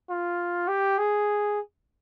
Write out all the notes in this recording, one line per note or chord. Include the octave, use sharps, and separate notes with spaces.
F4
G4
G#4